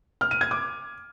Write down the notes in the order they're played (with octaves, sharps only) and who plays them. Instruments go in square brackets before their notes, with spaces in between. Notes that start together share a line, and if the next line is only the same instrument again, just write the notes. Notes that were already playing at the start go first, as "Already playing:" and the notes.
[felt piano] F6
D#7
G#6
D6